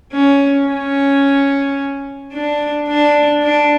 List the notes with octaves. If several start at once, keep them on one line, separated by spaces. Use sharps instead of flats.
C#4
C#4
D4
D4
D4